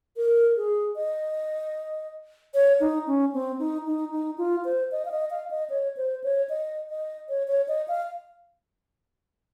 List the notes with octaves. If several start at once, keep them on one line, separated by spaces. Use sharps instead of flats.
A#4
G#4
D#5
C#5
D#4
C#4
C4
D#4
D#4
D#4
F4
C5
D#5
F5
D#5
F5
D#5
C#5
C5
C#5
D#5
D#5
C#5
C#5
D#5
F5